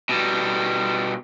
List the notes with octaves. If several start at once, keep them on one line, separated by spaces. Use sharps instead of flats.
B2 G3